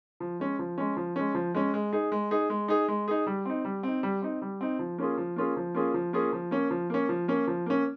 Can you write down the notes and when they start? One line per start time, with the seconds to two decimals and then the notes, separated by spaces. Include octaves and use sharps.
0.20 F3
0.40 G#3 C#4
0.59 F3
0.78 G#3 C#4
0.97 F3
1.16 G#3 C#4
1.34 F3
1.54 G#3 C#4
1.74 G#3
1.93 D#4 G#4
2.12 G#3
2.31 D#4 G#4
2.50 G#3
2.68 D#4 G#4
2.88 G#3
3.08 D#4 G#4
3.27 G3
3.45 C4 D#4
3.65 G3
3.83 C4 D#4
4.03 G3
4.22 C4 D#4
4.42 G3
4.61 C4 D#4
4.79 F3
4.98 A#3 C#4 F4 G#4
5.17 F3
5.36 A#3 C#4 F4 G#4
5.57 F3
5.75 A#3 C#4 F4 G#4
5.94 F3
6.13 A#3 C#4 F4 G#4
6.33 F3
6.51 A#3 C#4
6.70 F3
6.90 A#3 C#4
7.09 F3
7.28 A#3 C#4
7.47 F3
7.66 A#3 C#4